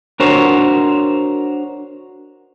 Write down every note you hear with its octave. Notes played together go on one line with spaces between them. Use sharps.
D4 F#4 A#4 C5 C#5